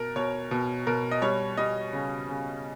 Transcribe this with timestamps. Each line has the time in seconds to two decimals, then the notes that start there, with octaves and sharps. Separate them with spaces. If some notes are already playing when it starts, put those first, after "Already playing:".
Already playing: B2 A#4
0.16 B2 C#5
0.51 B2
0.87 B2 A#4
1.11 D#5
1.22 G3 C#5
1.57 G3 D#5
1.93 C#3
2.29 C#3